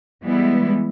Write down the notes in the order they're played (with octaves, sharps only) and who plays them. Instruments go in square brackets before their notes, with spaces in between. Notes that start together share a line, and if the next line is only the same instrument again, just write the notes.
[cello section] E3 G3 G#3 B3 E4